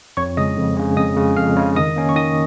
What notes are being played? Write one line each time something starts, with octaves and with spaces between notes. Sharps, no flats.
F2 C#5 C#6
C#3 G#3 D#5 D#6
F2
C#3 G#3
F2 D#5 D#6
C#3 G#3
F2 F5 F6
C#3 G#3
D#3 D#5 D#6
A#3 C#4
C#6
D#3 D#5 D#6